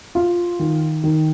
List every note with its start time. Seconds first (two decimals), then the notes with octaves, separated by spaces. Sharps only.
0.15 F4
0.59 D#3
1.04 D#3